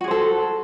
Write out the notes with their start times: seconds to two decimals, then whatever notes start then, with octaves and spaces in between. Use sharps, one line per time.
0.01 F#4
0.04 G#4
0.08 C5
0.11 A4